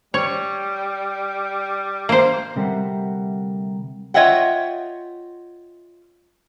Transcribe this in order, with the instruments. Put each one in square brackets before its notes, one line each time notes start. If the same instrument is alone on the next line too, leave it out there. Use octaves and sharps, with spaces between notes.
[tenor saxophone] G3 [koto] C#5
[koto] A#3 C5
[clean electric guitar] D2 C3 G3 A#4 E5 F#5
[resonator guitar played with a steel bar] F4 C#5 D#5 E5 F#5 G5